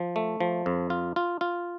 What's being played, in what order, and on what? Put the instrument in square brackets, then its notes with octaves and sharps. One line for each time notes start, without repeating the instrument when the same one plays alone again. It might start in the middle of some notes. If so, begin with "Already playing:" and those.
Already playing: [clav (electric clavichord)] F3
A3
F3
F2
F4
F4
F4